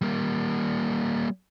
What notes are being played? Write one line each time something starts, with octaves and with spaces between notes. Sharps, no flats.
G3 A#3